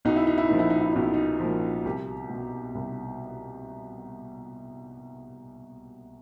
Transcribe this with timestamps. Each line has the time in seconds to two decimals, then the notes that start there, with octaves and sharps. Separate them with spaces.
0.05 B1 D#4
0.16 E4
0.27 D#4
0.38 E4
0.49 A#2 F3 D#4
0.59 E4
0.70 D#4
0.80 E4
0.92 B1 D#4
1.02 E4
1.14 D#4
1.40 A#2 F3
1.85 C2 G4
2.30 B2
2.75 C2